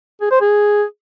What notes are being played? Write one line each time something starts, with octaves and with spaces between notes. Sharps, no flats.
G#4
C5
G#4